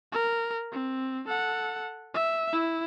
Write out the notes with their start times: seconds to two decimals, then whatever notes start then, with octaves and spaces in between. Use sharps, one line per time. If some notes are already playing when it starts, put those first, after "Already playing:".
0.12 A#4
0.72 C4
1.28 A4 F#5
2.14 E5
2.53 E4